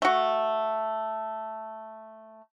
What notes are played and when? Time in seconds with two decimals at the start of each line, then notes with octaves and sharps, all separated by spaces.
0.02 A3 F#4